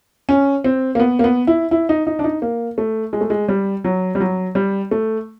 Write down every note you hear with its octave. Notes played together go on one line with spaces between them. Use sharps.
C#4
C4
A#3
B3
A#3
B3
E4
E4
D#4
D#4
D4
D#4
A#3
A3
G#3
A3
G#3
G3
F#3
G3
F#3
G3
A3